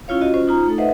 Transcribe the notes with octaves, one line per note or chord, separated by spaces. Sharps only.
C#4 E4 F4 C#5 F5
F4 F#4 D#5
C#4 F4 C5
D#4 F4 A#5
A3 D#4 A4
A4 B4 C5 D#5 E5 F#5